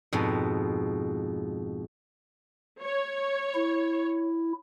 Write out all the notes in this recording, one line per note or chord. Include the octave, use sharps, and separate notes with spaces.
F2 G#2 B2
C#5
E4